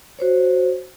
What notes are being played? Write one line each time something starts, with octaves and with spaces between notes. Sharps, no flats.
F#4 C5 C#5